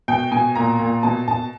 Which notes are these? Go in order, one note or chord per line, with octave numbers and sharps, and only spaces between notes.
B2 G5
B2 G#5
A#2 A#5
A#2
B2 A5
B2 A5